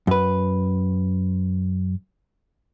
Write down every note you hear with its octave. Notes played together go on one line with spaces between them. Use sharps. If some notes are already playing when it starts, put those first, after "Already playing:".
F#2 B4